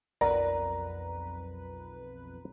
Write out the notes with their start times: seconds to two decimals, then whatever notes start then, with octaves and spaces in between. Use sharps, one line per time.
0.21 B1 F2 A#4 B4 D5 F#5 A#5